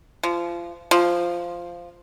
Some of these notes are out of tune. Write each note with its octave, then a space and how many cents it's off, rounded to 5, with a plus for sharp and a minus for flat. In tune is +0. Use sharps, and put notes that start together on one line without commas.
F3 -25
F3 -5